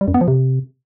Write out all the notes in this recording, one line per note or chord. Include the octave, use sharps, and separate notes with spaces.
G3
F#2
B3
F3
C3